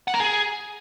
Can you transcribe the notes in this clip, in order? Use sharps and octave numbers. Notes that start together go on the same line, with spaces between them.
F#5
A#4
G#4